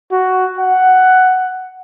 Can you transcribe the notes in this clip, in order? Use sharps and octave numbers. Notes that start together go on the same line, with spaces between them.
F#4
F#5